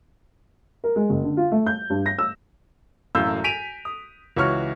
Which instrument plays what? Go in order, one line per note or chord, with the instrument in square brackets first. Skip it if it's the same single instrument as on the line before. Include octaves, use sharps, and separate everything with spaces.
[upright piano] A#4
G#3
F#1
D3
F4
A3
G6
G2
A#6
E6
E1 F#2 A2 F5 E6 G6
G#5 B6 D7 D#7 F7
D#6
C#2 E3 F#4 C#5 C#6 F6